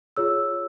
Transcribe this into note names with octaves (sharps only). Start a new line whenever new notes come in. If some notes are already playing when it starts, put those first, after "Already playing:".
F4 G#4 C#5 E6